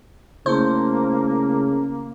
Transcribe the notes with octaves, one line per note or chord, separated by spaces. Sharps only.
C#3 A3 A#3 E4 C5